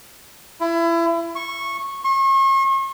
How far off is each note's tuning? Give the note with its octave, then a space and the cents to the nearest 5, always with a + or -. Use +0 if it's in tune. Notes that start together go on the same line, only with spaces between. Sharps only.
E4 +30
C#6 -15
C#6 -45